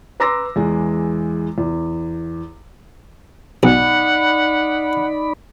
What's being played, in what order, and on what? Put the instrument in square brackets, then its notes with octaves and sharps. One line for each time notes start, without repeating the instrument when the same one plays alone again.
[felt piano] B4 A#5 C6 D6 E6 A#6
E2 E3 G#3
E2
[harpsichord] B1 [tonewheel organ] D#4 D5 B5 [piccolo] F#5